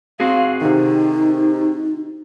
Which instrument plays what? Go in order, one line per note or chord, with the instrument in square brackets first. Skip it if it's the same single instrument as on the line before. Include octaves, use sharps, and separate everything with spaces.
[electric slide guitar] C4 F#4 G#4 [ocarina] F5
[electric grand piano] C3 D#3 [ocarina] D#4